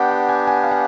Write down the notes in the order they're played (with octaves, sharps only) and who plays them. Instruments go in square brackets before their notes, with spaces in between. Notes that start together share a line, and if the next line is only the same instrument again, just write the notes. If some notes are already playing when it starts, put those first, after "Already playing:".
Already playing: [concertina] B3 D4 G4 [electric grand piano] F#5 G5
[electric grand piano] G5
G#5
G#5
F5
F#5